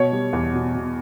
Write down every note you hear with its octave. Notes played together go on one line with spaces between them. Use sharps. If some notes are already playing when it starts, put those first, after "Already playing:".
Already playing: B2 C#5
G3
E2
B2
B2